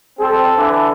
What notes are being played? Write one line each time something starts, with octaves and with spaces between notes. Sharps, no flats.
G3 C4 A4
D3 E3 D4